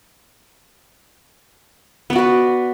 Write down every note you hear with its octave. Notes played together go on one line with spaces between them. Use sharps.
B3 F#4 B4 D5